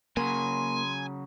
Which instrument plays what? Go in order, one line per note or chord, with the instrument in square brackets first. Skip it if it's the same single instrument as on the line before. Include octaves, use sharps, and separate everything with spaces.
[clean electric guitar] C#3 F#3 [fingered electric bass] A#3 [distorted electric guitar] G#5 [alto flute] C6